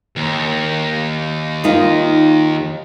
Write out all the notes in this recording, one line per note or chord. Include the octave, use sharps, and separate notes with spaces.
D#2
D#3 D#4 F4